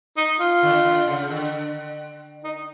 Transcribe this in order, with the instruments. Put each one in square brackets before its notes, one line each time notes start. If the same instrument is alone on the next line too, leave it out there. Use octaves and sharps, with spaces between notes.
[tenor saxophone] D#4
F4
[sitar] D3
D3
C#3
D3
[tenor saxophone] D#4